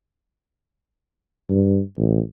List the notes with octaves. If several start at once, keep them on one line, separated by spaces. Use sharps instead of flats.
G2
A1